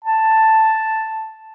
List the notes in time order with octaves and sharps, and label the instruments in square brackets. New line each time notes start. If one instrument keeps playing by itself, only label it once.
[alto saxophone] A5